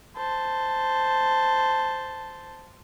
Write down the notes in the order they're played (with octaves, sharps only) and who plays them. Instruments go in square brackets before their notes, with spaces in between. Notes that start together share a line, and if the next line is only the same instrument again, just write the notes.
[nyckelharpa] C5 A5